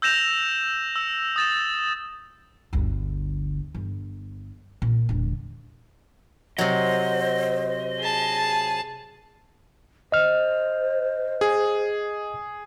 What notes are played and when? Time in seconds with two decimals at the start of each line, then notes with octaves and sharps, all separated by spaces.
0.02 E6 G6 A#6 E7 F7
0.96 E6
1.36 D#6 A6 E7
2.73 G1 D2
3.75 G1
4.82 A#2
5.09 E1 D3
6.58 C3 F#3 C5 D#5
8.00 G#4 A5
10.12 C5 D#5 F6
11.41 G#4